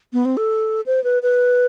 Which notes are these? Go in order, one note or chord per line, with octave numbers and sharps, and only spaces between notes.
B3
C4
A4
C5
B4
B4